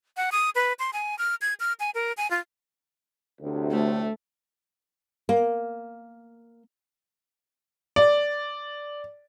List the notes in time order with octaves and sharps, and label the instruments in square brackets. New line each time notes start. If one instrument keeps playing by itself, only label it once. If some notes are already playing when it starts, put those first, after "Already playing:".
[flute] F#5
D#6
B4
C6
G#5
F6
G#6
F6
G#5
A#4
G#5
F4
[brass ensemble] D2 A2 C3
[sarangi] A3
[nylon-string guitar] A#3
[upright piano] D5